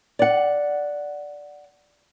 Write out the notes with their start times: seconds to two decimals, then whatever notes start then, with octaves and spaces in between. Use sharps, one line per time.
0.19 D5 F#5